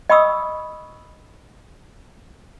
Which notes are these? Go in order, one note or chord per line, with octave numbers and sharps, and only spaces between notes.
D#5 G5 B5 C#6 D#6 E6